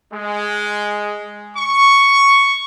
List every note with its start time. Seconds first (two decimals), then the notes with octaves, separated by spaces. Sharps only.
0.13 G#3
1.57 C#6